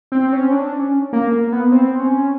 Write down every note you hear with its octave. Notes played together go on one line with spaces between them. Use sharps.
C4
C#4
D4
C#4
A#3
A#3
B3
C4
C#4